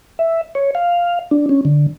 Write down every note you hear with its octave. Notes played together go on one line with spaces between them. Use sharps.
E5
C#5
F5
D4
C#4
D3